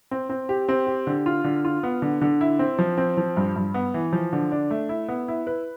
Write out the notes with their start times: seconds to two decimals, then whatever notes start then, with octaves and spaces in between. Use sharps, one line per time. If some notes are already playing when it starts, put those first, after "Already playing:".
0.11 C4
0.29 C4
0.49 G4
0.69 C4
0.87 G4
1.07 D3
1.26 F4
1.44 D3
1.65 F4
1.83 B3
2.02 D3
2.21 D3
2.41 E4
2.59 C4
2.79 F3
2.98 C4
3.17 F3
3.37 G2
3.56 G2
3.74 B3
3.94 E3
4.13 F3
4.33 D3
4.52 D4
4.71 A3
4.89 E4
5.08 B3
5.28 E4
5.47 B4